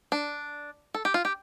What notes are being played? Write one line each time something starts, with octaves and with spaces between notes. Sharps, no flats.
D4
A4
G4
F4
G4